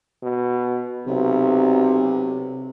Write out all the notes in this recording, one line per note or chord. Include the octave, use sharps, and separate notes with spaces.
B2
B1 C3